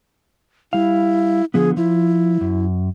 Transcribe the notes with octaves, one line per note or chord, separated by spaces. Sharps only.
G3 E4 F5
D3 F3 B3 G#4
F3 E4
F#2